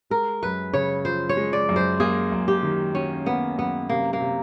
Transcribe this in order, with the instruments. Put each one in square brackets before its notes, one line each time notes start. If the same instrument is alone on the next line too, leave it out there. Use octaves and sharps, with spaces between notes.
[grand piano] G#3 [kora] A#4
[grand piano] F#2 [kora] B4
[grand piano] C#3 [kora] C#5
[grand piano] F3 [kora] C5
[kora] C#5
[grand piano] G#3
[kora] D5
[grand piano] F#2
[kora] C5
[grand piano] A#3 [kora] G#4
[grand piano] F#2
[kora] G4
[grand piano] D#3
[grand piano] F#3 [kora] C#4
[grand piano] A#3 [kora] B3
[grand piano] F#2 [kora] B3
[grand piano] C3 [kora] A#3
[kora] A#3
[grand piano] C3